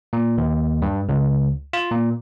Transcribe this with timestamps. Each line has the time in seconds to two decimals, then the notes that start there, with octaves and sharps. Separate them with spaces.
0.13 A#2
0.38 D#2
0.82 G2
1.09 C#2
1.73 F4
1.91 A#2